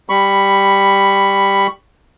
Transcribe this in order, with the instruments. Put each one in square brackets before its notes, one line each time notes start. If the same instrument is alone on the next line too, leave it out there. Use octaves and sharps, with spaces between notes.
[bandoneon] G3 B5 C#6